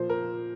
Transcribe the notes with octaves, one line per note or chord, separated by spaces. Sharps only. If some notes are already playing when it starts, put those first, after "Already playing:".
Already playing: A#2 F3 C5
A#4